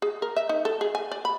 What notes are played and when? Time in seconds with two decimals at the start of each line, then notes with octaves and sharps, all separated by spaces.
0.02 G#4
0.22 A#4
0.36 E5
0.49 D#4
0.65 A4
0.81 G#4
0.95 G#5
1.12 D5
1.25 B5